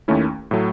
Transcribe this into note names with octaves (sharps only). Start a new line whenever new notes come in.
D#2 D#3 A3 C#4 E4
A2 F#3 A3